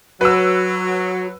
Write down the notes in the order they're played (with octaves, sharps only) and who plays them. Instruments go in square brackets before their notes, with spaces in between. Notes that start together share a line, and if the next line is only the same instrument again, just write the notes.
[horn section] F#3 [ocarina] F#4 [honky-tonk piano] B4 E6